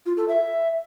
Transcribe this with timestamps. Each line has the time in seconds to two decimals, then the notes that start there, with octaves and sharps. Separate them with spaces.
0.06 F4
0.17 A4
0.28 E5